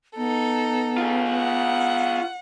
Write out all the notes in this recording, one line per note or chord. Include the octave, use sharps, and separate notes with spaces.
B3 D#4 A4
F4 G#4
F#5